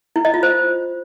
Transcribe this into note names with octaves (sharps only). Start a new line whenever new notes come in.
E4
D#5
F4
C5